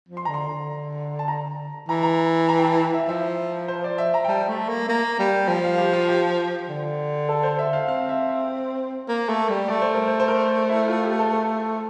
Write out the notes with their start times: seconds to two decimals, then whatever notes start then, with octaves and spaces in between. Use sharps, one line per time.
0.09 F3
0.17 C6
0.25 D3 A#5
0.34 C6
0.48 D3
1.19 A5
1.28 A#5
1.88 E3 A#5
2.03 A#5
2.49 A#5
2.58 G5
2.64 A5
2.78 G5
2.93 E5
3.08 F3 E5
3.68 C5
3.84 D5
3.98 E5
4.14 A#5
4.24 G5
4.28 G3 A5
4.48 A3
4.69 A#3
4.88 A#3
5.19 G3
5.48 F3 G5
5.64 F5
5.78 G4
5.93 F4
6.08 G4
6.69 D3
7.29 A4
7.43 C5
7.59 E5
7.73 F5
7.88 C4 F5
8.09 E5
8.29 E5
9.08 A#3
9.29 A3
9.49 G3
9.68 A3 D5
9.82 C5
9.94 A#4
10.08 C5
10.20 C5
10.28 A#4
10.69 E4
10.88 F4
11.04 G4
11.19 A4
11.33 A4